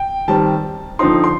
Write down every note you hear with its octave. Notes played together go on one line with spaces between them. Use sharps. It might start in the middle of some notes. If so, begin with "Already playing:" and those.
Already playing: G5
D#3 G3 C4 A5
D3 F3 C4 D#4 C6
C6